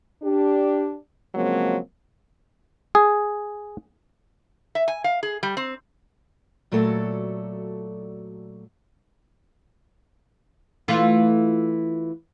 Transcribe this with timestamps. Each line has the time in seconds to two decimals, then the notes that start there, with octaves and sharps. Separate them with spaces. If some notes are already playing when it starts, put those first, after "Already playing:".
0.23 D4 G4
1.35 C#3 F3 F#3 G#3 A#3 C4
2.95 G#4
4.75 E5
4.88 G#5
5.04 F5
5.23 G#4
5.43 G3
5.57 C4
6.72 A#2 F#3 A3 F#4 A4 D5
10.88 E3 A3 F4